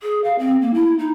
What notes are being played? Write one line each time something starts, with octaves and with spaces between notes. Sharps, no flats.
G#4
F5
C4
A#3
E4
D#4